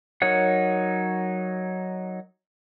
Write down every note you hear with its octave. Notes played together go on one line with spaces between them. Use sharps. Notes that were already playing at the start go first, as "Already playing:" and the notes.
F#3 D#4 A#4 C#5 F#5